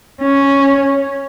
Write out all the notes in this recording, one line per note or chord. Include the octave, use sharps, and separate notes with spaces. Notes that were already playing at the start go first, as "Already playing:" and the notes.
C#4